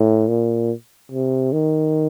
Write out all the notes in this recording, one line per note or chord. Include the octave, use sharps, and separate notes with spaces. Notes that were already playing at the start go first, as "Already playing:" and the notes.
Already playing: A2
A#2
C3
D#3